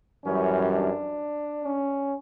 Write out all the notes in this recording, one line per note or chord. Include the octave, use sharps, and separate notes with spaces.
F#2 E3 G3 C#4
D4
C#4